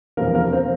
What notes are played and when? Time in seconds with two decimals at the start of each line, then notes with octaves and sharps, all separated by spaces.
0.17 E2 C3 F3 A#3 A#4
0.35 A#3 A#4
0.52 F3 C4 C5